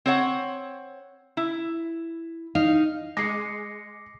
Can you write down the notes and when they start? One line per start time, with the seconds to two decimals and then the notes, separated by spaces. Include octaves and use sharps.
0.06 C4 C#5 F#5
1.37 E4
2.55 D#4 F5
3.17 G#3 D6 D#6 A#6 C7 C#7